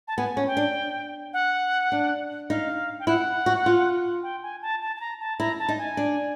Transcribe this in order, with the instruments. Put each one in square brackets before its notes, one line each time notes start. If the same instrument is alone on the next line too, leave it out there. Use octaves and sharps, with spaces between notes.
[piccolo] A5
[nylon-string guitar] B3 [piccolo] G#5
[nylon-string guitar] C#4
[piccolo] G5
[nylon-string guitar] D4
[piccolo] F#5
[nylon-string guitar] D4
[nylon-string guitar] D#4 [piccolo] F5
[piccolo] G5
[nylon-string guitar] E4 [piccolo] F#5
[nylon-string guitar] F#4
F4
[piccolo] G5
G#5
A5
A5
A5
A#5
A5
[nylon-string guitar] E4 [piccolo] A#5
[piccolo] A5
[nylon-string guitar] D#4
[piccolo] G#5
[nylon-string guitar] D4